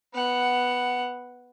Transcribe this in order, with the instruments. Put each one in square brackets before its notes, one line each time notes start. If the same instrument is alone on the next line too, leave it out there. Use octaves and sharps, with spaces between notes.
[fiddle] B3 F#5